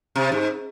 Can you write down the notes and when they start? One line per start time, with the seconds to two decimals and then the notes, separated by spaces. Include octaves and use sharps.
0.16 C3
0.32 G#2